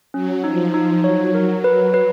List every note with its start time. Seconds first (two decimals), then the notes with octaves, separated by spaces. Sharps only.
0.14 F#3 C#4
0.44 F3 D#4
0.74 D#4
1.03 F#3 C#5
1.34 A#4
1.64 B4
1.94 B4